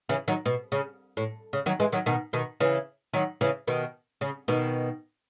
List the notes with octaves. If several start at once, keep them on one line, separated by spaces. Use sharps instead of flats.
C#3 E3
D#3 F#3
B2
C#3
A2
C#3
D#3 F#3
E3 G#3
D#3 F#3
B2 D#3
B2 D#3
C#3 E3
D#3 F#3
C#3 E3
B2 D#3
C#3
B2 D#3